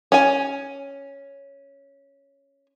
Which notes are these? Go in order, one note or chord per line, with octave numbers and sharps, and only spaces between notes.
C#4 G#5